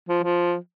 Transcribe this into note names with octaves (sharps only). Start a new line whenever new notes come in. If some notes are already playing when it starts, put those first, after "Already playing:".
F3
F3